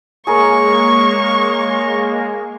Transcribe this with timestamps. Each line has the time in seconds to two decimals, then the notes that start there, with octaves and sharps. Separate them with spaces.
0.27 G#3 A#3 G#4 A#4 C#5 A#5 C#6